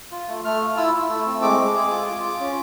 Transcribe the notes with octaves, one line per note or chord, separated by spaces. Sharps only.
F4
A3
A3 F6
F4
E4 E6
E4
A3
C4
G#3 D6
G#3
G#4
F4
F4
F4
C#4